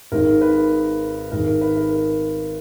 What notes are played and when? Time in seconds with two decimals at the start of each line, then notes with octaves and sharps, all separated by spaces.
0.12 G#1 G#2 D#3 G#3 A#4
0.41 B4
1.31 G#1 G#2 D#3 G#3 A#4
1.47 A#4
1.61 B4
1.76 A#4
1.91 A#4